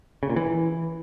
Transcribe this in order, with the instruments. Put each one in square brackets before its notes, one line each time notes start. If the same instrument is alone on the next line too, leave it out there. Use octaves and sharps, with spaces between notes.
[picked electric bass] C#3
A#2
E3